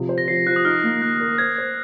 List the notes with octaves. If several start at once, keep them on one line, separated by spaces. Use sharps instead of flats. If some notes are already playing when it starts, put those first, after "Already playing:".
Already playing: C3 F3
C5
A#6
F3 C7
F3 F#6
D#6
D#4 F6
A#3
A#3 F#6
A#4
C5 G#6
C5